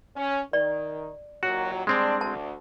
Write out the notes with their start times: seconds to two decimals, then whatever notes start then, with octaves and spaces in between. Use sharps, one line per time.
0.16 C#4
0.53 D#3 D5
1.43 D#2 A#2 F#3 F#4
1.87 G3 G#3 C4 D4
2.21 D2 A5